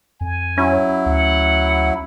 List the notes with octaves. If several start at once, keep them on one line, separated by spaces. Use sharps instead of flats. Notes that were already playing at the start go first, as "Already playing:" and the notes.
F2 G#5
F#3 C#4 E4
D2 F#5